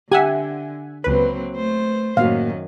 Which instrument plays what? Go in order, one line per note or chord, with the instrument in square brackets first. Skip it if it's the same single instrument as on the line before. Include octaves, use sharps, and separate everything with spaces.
[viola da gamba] D3 [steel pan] G4 [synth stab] E5 F#5 G#5
[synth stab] C#2 B4 [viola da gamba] F#3 A#3 C4
[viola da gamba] A3 C5
[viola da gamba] F#2 D#3 [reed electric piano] A2 A#3 F#4 [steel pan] F5